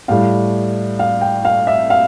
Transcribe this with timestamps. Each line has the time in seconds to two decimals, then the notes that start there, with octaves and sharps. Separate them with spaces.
0.08 A2 G3 F5
0.99 F5
1.21 G5
1.45 F5
1.67 E5
1.90 F5